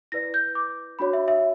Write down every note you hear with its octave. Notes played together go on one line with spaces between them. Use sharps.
E4 B4 D5 A#6
G6
D6
D4 F#4 C#5 B5
E5
E5